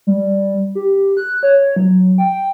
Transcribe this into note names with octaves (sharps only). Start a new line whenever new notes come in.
G3
G4
F#6
C#5
F#3
G5